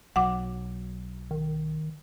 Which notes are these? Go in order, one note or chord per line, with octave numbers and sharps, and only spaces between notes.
B1 F#3 F#5 D6
D#3